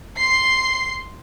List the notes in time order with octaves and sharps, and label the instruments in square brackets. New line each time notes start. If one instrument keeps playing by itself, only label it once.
[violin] C6 C7